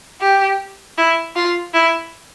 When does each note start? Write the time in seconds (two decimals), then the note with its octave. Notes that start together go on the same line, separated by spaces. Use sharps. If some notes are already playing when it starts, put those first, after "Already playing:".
0.21 G4
0.98 E4
1.36 F4
1.74 E4